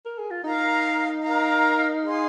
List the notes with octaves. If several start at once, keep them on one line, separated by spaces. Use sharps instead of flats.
A#4
G#4
F4
D#4 A#4 F5 A#5
A#4 F5 A#5
G#4 F5 C6